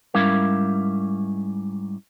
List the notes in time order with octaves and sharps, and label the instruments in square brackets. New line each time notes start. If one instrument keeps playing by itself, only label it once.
[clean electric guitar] G#2 G3 C#4 E4 A#4 F5